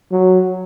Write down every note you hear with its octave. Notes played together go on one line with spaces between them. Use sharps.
F#3